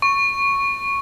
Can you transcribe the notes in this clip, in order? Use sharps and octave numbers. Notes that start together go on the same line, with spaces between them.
C#6